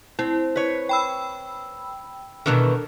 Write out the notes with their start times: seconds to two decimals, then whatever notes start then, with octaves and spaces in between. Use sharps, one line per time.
0.19 C4 E4
0.56 B4 C#5
0.89 G5 B5 E6
2.46 B2 D#3 E3 D4 A4 A#4